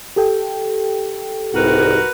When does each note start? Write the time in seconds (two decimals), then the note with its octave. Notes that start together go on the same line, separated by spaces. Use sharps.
0.16 G4 A4 G5
1.54 C2 G#2 F#4 A#4 B4